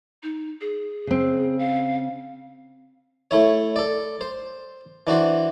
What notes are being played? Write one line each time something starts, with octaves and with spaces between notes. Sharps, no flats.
D#4
G#4
C#3 C4
F5
A3 E4 C#5
A4 D5
C5
E3 D4 F#4 C5